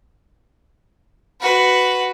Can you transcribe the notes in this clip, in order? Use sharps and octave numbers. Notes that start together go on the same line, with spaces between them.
F#4 B4